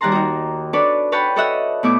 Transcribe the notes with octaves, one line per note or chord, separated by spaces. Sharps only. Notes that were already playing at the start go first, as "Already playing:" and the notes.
D#2 G3 F#5 A5 A#5 C6
D#4 F#4
D4 A4 B4 C#5 D5
B4 C#5 F#5 G5 A5 B5
F#4 A4 C#5 D#5 E5 F#5
B2 A3 E4 D6